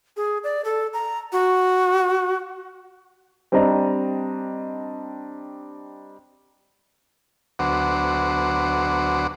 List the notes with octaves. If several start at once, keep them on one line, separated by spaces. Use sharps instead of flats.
G#4
D5
A4
A#5
F#4
G3 C4 D4 D#5 A#5
D2 F#3 B3 F#4 C5 D6